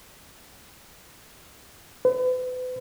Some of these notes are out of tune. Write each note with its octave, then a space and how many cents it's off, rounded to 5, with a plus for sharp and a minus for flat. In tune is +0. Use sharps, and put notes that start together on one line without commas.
B4 +40